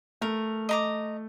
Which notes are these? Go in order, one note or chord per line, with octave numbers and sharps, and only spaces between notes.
A3 A#4
D#5 A#5 D6